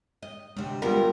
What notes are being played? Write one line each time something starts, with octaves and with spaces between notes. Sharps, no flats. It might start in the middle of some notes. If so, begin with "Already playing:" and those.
D#5
D2 C3 G#3
E2 G3 B3 F4 A#4